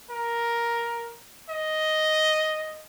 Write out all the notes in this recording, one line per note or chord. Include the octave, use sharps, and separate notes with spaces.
A#4
D#5